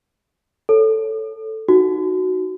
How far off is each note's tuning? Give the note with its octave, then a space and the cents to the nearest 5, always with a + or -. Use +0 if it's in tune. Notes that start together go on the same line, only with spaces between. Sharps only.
A4 +0 C#5 +0
D#4 +0 F#4 +0